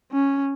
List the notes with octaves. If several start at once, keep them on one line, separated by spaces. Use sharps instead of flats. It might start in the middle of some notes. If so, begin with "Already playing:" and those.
C#4